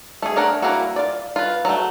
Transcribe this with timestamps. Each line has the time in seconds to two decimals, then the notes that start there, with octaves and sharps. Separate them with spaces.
0.22 A3 G#4
0.36 A3 D4 A#4 C#5 F#5
0.62 G3 A#3 C#4 E4 F#4
0.96 F4 D5
1.36 F4 B4
1.65 F#3 A3